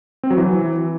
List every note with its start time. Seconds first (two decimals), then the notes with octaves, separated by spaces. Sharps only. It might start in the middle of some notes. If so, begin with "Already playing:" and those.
0.23 C4
0.31 F#3
0.38 E3